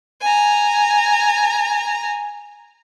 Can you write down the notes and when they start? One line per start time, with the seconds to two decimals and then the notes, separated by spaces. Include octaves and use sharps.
0.21 G#5 A#5